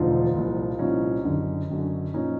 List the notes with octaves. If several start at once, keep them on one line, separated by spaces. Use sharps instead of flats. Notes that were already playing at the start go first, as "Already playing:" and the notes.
Already playing: E1 D2 F3 D#4 F4
C2 A#2 F3
C2 A#2 F3 C#4 D#4
F#1 F#2 D3
F#1 F#2 D3
A#2 F3 C#4 D#4